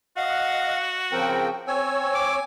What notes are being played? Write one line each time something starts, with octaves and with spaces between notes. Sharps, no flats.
F#4 D#5 F5 F#5
C#3 F3 C4 A#4 G5
C4 C#5 G#5 E6
D6